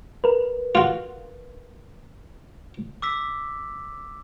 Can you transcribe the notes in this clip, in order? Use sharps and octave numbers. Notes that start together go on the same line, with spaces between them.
A#4 B4
F4 F#4
D6 E6 B6